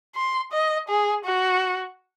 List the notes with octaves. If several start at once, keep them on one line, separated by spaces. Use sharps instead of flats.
C6
D#5
G#4
F#4